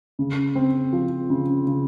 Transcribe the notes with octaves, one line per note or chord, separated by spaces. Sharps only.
C#3
C4
F3
C#3
C#3